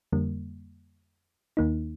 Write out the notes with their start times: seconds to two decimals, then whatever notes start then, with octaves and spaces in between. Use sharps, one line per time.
0.12 F2 D3 G3 A#3
1.57 D#2 D#3 A#3 D#4